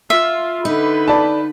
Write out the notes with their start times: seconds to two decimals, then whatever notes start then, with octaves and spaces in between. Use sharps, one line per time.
0.10 F4 E5
0.65 D3 D#4 B4 B5
1.08 D5 A5